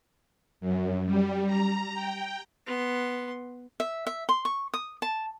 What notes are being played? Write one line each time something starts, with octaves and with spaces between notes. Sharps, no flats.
F#2
G3
A#5
G5
B3 C6
E5
E5
C6
C#6
D#6
A5